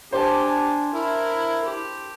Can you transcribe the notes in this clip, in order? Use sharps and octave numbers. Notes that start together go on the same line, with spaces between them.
D4 G4 C5 G#5 A5
E4 A#4
G4